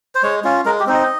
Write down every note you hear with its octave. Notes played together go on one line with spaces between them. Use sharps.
C5
G#3 C#5
C#4 F4
G#3 A#4
G4
C4 D#4
D#5